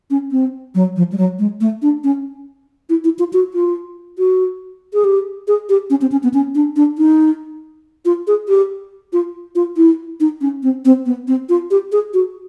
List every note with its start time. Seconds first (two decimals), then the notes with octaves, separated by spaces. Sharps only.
0.10 C#4
0.31 C4
0.75 F#3
0.96 F3
1.12 G3
1.18 F#3
1.39 G#3
1.61 A3
1.82 D4
2.04 C#4
2.89 E4
3.04 E4
3.19 F4
3.33 F#4
3.54 F4
4.18 F#4
4.94 G#4
5.04 G4
5.48 G#4
5.69 G4
5.90 C#4
6.02 C4
6.12 C#4
6.23 B3
6.34 C#4
6.55 D4
6.76 D4
6.98 D#4
8.05 F4
8.27 G#4
8.48 G4
9.13 F4
9.55 F4
9.77 E4
10.20 D#4
10.41 C#4
10.63 C4
10.85 C4
11.06 B3
11.28 C4
11.49 F4
11.71 G4
11.92 G#4
12.14 F#4